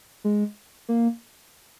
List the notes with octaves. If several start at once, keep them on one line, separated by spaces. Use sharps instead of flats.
G#3
A#3